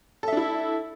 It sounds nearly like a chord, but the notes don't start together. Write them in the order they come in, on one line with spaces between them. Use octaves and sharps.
A4 E5 D4 E4